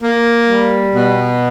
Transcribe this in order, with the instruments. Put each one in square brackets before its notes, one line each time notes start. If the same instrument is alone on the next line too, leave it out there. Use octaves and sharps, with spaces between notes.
[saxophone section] A#3
G3
B2